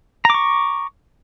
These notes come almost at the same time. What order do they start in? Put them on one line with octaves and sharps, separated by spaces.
A#5 D6 C#6